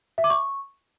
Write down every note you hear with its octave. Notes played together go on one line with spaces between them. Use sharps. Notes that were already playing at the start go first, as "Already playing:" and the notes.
E5
D6
C#6